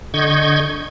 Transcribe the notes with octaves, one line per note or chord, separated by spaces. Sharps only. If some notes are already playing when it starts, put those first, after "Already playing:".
D3 D#5 C#6 G6 G#6